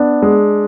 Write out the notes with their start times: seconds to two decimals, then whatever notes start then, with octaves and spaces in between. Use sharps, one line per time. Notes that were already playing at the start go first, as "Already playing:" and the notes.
Already playing: B3 D4
0.22 G#3